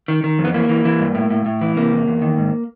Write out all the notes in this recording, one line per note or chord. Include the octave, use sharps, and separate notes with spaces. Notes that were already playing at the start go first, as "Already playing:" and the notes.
D#3
D#3
F2
B3
E3 A#3
E3
E3
G2
A2
A2
A2
E3
C3 A#3
E2
E2
D#3
G#2